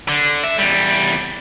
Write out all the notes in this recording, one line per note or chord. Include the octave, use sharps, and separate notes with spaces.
D3
E5
E2 G3